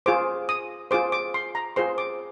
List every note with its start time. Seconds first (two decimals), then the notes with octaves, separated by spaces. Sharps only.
0.06 F4 G#4 C5 D6
0.49 D#6
0.91 F4 G#4 C5 D6
1.12 D6
1.34 C6
1.55 A#5
1.76 F4 G#4 C5 C6
1.98 D6